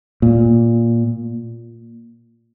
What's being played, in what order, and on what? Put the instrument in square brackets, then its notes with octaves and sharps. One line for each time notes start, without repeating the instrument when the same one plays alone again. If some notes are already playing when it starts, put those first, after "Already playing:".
[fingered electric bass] A#2